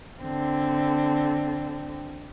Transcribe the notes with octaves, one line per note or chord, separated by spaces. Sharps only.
D3 C4